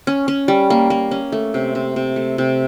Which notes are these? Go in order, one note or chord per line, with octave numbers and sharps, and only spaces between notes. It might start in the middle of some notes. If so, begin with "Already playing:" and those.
C#4
C#4
G3
A#3
A#3
C#4
A3
C3
C3
C3
A3
C3